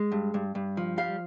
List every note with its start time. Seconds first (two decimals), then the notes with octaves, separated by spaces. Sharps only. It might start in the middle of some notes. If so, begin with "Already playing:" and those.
Already playing: G#3
0.12 G2
0.34 G2
0.55 G2
0.77 F3
0.98 G3 F5